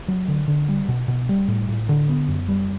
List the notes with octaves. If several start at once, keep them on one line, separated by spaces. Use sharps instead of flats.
F#3
D3
D3
G3
B2
B2
G3
A2
A2
D3
B3
F#2
G3